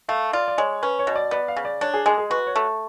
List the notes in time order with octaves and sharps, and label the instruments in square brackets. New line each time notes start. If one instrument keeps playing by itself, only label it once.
[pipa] A3 [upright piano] F5
[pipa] F4 [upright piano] D5
[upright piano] D5
[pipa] G#3 [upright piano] C#5
[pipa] C#4 [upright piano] B4
[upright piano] C#5
[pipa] B2
[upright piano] D5
[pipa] B3 [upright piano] D5
[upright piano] F5
[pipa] C#3
[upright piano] D5
[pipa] D4 [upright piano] C#5
[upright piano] G#4
[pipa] G#3 [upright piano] G#4
[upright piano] G#4
[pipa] F#4 [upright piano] B4
[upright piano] C#5
[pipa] A3